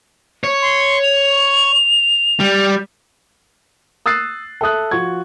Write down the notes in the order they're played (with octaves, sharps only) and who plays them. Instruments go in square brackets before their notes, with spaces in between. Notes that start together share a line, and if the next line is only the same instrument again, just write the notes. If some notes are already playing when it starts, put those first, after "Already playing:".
[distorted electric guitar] C#5
[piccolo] C6
F7
[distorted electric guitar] G3
[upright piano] D#6 E6 F#6 A6 C7
A4 E5 D#6 F#6
F3 F#4 C#6 G#6